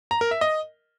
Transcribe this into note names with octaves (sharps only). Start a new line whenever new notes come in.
A#5
A#4
E5
D#5